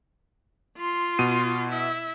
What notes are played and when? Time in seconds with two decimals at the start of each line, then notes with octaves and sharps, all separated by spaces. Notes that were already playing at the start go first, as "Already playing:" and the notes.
0.77 F4 C6
1.19 B2 D#7
1.69 E4 E5